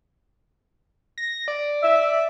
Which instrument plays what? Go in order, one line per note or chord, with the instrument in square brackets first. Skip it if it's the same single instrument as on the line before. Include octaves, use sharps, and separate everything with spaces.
[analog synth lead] A#6
D5
[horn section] E5